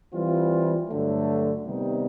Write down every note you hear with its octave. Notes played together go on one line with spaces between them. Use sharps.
E3 G3 C4 F4
G2 D3 F#3 A3
C3 D#3 G3 B3 D#4